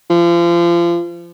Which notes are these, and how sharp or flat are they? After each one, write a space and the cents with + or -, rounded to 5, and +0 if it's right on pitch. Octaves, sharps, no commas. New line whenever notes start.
F3 -30